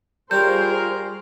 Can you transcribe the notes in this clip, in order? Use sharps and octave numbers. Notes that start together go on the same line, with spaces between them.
G3 C#4 F4 G4 G#4 A#4 C5 G6